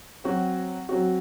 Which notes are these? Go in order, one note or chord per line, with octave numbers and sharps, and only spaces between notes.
F#3 C4 F#4
F#3 C4 F#4